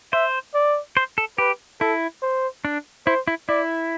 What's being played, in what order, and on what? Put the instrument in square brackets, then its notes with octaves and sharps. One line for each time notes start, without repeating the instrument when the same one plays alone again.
[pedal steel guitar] C5 [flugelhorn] E5
[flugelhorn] D5
[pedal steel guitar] C5
A4
[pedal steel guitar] G4 [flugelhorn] B4
[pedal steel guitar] E4 [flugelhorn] A4
[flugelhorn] C5
[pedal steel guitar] D4
[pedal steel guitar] E4 [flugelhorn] C5
[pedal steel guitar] E4
[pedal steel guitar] E4 [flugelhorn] D5